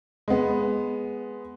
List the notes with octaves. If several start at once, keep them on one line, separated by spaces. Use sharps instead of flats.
G#3 B3